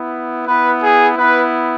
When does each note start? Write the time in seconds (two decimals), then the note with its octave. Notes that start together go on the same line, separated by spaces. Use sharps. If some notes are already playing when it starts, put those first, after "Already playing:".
Already playing: B3 E4
0.47 B3 E4 B4
0.82 G#4
1.18 B3 E4 B4